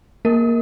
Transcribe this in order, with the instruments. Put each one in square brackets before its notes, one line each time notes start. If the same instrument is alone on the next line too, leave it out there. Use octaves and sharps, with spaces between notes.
[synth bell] A#3 A#4